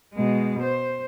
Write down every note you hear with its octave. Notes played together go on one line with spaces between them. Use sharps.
B2 G#3
C5